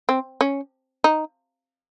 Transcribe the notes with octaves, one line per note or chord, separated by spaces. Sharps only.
C4
C#4
D#4